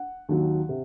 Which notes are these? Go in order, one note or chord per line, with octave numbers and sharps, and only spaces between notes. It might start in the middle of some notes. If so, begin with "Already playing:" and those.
Already playing: F#5
D#2 D#3 F#3
C3